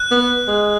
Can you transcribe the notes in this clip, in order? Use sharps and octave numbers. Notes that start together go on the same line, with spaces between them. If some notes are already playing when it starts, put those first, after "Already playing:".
Already playing: F#6
B3
G#3